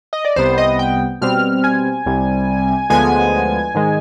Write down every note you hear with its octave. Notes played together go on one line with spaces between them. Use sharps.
D#5
D5
C2 C3 G3 B3 C5
D#5
G5
B2 G3 C4 F6
G#5
C2 C3 G3
D2 D3 F3 G#3 B3 G#5
G#2 D#3 G#3